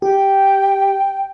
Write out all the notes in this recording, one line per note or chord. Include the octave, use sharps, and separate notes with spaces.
G4 G5